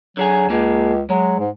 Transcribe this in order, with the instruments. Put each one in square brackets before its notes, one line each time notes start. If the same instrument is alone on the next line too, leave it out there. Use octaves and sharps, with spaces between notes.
[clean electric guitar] D3 G#4 G#5 [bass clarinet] F#3
[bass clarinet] C#2 [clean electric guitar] A#3 G#4
[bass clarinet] F#3 [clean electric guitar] G#3
[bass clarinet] G#2